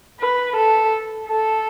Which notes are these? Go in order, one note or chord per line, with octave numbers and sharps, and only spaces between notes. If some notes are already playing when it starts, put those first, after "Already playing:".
B4
A4
A4